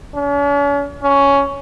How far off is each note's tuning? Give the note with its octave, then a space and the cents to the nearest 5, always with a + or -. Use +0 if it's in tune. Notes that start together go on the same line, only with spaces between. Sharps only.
C#4 +45
C#4 +10